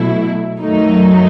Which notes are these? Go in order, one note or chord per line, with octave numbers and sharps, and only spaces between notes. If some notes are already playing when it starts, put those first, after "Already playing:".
Already playing: B2 F#3 A3 E4
F#2 D#3 F#3 A3 D#4